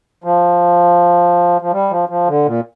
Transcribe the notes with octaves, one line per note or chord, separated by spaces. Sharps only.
F3
F3
G3
F3
F3
D3
A#2